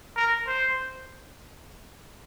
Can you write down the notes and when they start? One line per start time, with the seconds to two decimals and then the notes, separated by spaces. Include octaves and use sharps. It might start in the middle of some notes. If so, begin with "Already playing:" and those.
0.16 A#4
0.47 C5